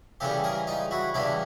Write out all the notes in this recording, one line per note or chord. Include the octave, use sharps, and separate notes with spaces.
E2 C#3 E3 G3 G4 A4
G#4 A#4
D#4 F4
E4 F#4
E2 C#3 E3 G3 D4 E4